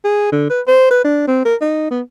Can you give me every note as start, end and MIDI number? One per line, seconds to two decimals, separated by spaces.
0.04 0.32 68
0.32 0.46 50
0.50 0.61 71
0.67 0.89 72
0.91 1.04 71
1.05 1.24 62
1.27 1.45 60
1.45 1.55 70
1.61 1.86 63
1.91 2.01 59